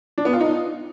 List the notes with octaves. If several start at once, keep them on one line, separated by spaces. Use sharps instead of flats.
D4
B3
F4
D#4